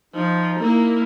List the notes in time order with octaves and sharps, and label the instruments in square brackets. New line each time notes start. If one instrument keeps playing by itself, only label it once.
[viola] F3 [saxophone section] D#4
[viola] A#3 E4